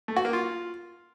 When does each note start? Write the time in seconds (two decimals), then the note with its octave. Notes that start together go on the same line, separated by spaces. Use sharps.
0.08 A3
0.16 F#4
0.25 A#3
0.33 F4